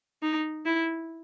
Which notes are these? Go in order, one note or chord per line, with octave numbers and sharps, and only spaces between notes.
D#4
E4